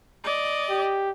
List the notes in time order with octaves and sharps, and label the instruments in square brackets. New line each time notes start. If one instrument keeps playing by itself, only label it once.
[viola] D5 D#5
[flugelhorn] G4